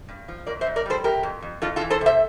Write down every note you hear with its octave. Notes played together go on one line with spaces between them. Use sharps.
G2
F3
F2 A#4 D5
C5 E5
F2
A#4 D5
G3 A4 C5
C3 G4 A#4
F2
F2
F2 F4 A4
F4 A4
E3
A4 C5
C3 C5 E5